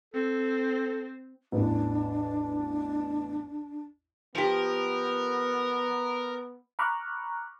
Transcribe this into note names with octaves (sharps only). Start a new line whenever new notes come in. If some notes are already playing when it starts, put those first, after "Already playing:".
C4 A4
A1 E2 D4
F3 B3 G4 A#4
A#5 B5 C#6 D6 F6 F#6